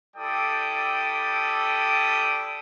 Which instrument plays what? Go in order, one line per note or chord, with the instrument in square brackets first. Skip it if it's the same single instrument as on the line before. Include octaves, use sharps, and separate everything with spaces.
[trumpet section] G3 E4 A4 D5 G5 D#6